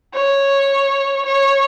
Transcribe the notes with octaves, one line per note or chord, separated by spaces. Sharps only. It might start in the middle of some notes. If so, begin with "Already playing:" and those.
C#5
C#5